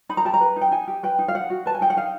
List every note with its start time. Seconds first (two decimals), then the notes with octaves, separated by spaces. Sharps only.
0.09 D#4 B5
0.17 A#5
0.25 G4 A5
0.34 A#5
0.41 B4
0.56 D#4 G5
0.71 D#4 G#5
0.88 G4
1.03 B4 G5
1.19 D#4
1.28 F5
1.34 D#4 F#5
1.50 F#4
1.66 B4 A5
1.75 G#5
1.81 D#4 G5
1.90 F#5
1.97 D#4 F5